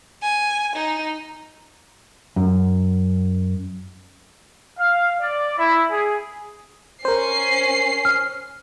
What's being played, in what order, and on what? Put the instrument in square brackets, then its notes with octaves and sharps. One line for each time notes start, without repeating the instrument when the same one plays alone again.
[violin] G#5
D#4
[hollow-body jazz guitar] F#2
[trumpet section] F5
D5
E4
G#4
[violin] C#4 C7 [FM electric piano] A#4 C5
[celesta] F6